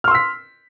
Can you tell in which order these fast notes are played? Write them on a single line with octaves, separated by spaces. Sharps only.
F6 C6 E6 B6